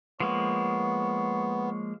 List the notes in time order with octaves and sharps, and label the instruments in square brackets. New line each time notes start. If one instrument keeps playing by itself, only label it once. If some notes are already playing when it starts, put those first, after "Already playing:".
[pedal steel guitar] F3 G#3 A#3 [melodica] B3 [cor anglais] C#5